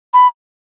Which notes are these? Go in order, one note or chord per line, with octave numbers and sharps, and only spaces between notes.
B5